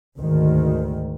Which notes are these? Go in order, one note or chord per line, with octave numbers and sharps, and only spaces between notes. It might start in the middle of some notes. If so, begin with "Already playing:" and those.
D2 G#2 D#3